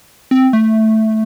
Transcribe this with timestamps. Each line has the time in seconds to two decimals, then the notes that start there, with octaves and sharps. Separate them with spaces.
0.31 C4
0.53 A3